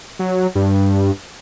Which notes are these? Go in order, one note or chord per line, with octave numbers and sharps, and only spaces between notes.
F#3
G2